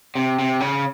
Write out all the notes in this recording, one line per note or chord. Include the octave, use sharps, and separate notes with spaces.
C3
C3
C#3